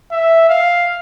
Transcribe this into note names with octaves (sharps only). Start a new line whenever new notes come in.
E5
F5